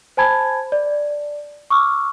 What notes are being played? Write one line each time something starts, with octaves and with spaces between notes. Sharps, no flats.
C5 G#5 A5 B5 G#6
D5
C#6 D6 E6 F6